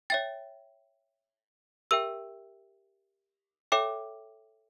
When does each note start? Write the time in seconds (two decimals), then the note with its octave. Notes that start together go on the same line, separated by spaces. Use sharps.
0.10 C#5 E5 G5 A6
1.91 G4 A#4 E5 G5 E6
3.72 A4 C#5 E5 G5 D6